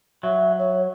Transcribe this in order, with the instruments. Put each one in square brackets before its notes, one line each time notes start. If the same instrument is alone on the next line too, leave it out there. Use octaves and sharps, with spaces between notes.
[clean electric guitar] F#3 [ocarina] E5
[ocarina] C#5